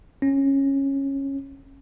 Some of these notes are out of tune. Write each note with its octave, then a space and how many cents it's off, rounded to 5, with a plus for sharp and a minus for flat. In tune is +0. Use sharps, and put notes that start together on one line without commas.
C#4 -15